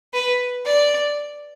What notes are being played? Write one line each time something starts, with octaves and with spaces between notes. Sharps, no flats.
B4
D5